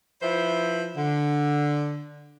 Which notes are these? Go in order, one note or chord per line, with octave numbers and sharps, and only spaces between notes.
F3 E4 B4 C5
D3